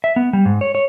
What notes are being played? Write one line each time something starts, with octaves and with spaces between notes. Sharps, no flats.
E5
B3
G3
G#2
C#5
C#5